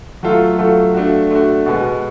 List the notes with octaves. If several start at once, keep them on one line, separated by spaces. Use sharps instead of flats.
F#3 A3 F4 A4
F#3 A3 F4 A4
A3 D4 F#4
A3 D4 F#4
B2 G#3 B3 F#4